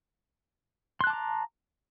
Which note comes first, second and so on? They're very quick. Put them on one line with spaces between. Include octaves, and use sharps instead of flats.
C6 F#6 A5 D6 A#5